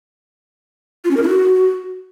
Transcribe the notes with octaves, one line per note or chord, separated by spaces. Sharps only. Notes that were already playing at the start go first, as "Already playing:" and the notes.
F4
C#4
A#4
E4
F#4